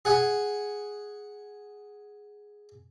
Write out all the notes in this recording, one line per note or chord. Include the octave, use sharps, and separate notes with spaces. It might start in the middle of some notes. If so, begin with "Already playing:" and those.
G#4 F#5 G#5